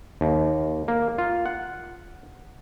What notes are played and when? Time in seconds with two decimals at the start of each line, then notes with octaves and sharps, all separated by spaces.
0.21 D#2
0.88 A#3
1.18 F4
1.46 F#5